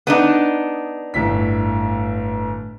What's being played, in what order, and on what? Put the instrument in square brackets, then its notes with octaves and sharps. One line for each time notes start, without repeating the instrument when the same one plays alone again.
[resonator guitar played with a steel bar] B3 D4 D#4
[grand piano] G1 A2 B6